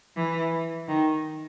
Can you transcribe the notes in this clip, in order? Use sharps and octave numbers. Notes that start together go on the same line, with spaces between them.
E3
D#3